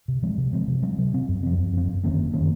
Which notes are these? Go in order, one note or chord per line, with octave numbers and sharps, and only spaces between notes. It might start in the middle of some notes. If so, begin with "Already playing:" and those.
C3
F3 G#3 C4
C3
F3 G#3 C4
C3
F#3 C4
C3
F#3 C4
F#2
F3 C4
F#2
F3 C4
F#2
D#3 A#3 C#4
F#2
D#3 A#3 C#4